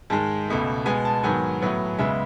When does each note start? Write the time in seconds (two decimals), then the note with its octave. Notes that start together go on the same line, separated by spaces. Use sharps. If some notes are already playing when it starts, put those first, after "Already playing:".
0.10 G#2 D#3 G#3 A5
0.48 C#2 B2 A3
0.85 B2 G#3 B3 G#5
1.05 A5
1.23 G#2 D#3 F#3 B3 G#5
1.62 A2 F#3 B3
1.99 C#2 C#3 G#3 B3 E5